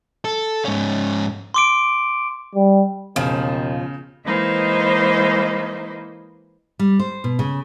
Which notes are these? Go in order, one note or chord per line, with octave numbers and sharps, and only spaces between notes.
A4
G#2 C#4
C6 D6 D7
G3
E1 D#2 C#3 F3
E3 G#3 A#3 D#4 E4 C5
G3
C5
B2
C#3